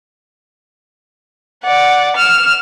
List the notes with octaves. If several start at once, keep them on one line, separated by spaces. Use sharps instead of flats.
D5 F#5
F6 E7